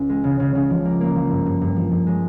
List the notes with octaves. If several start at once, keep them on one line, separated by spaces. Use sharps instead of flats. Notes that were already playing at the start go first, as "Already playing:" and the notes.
Already playing: C#2
G#3
C#3
C#3
C#3
F3
A#3
A#3
F3
G2
G2
G2
F3
G2
G#3